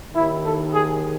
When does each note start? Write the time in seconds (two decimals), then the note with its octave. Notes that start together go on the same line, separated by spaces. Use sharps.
0.14 D#3 E4
0.19 D#2
0.44 A4
0.73 G#4